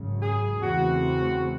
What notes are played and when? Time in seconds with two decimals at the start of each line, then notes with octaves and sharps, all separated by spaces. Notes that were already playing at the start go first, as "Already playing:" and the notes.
Already playing: G#1 F#2 C#3
0.21 G#4
0.62 E2 C#3 E3 A3 C4 F#4